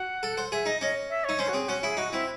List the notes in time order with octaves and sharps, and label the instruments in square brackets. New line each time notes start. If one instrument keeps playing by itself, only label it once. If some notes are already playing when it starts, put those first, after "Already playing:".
Already playing: [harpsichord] F#4 [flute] F#5
[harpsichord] A4
C5
[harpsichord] G#4 [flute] E5
[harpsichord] D#4 [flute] D#5
[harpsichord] C#4 [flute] D#5
[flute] E5
[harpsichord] D#4 [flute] C#5
[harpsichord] C#4 [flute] C5
[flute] F#4
[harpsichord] C4 [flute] G#4
[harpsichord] C#4 [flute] F#4
[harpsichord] E4 [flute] G#4
[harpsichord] D#4 [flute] F#4
[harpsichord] C4 [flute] E4